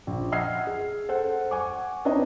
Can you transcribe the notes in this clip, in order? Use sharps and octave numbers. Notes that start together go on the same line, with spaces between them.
A#1
D#5 F#5 E6 F6 G#6 C7
G#4
A4 C5 F#5
F#5 G#5 C#6 D6
C4 D4 D#4 B4 C#5 D#5